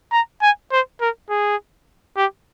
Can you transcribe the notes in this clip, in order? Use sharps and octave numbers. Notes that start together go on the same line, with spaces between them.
A#5
G#5
C5
A#4
G#4
G4